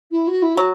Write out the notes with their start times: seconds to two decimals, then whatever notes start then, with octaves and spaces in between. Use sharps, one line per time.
0.11 E4
0.27 F#4
0.42 E4
0.55 F#3 F#4